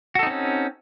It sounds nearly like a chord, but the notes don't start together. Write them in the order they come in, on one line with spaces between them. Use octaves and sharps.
F#4 A4 D#4 C4 C#4